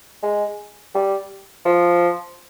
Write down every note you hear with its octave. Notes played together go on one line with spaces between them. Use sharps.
G#3
G3
F3